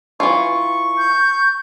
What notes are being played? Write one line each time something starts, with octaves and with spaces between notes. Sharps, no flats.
E3 F4 C#6
G6